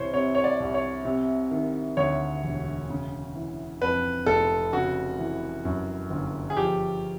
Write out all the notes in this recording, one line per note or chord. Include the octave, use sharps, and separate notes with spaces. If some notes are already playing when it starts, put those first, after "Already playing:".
Already playing: C2 E3 C5 C#5
C3 C#5
C#5
D5
C2
C#5
C3
D#3
D2 C#5
E1
C#3
E3
F2 B4
F1 A4
C#3 F#4
E3
F#2
G1
G#4
F3 G4